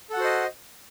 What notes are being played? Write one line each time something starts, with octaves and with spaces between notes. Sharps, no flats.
F#4 A4 C5 D#5 F#5